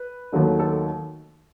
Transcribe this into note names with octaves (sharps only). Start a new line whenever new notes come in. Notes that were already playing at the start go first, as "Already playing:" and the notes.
Already playing: B4
D#2 D#3 F#3 A3
A4